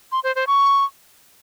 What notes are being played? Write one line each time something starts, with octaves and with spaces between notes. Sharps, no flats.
C6
C5
C5
C#6